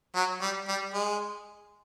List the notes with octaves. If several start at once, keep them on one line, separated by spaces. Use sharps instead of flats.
F#3
G3
G3
G#3